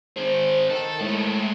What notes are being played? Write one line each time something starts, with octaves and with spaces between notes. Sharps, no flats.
D#3 G#4 C5
D#3 A4
A2 G#3 A3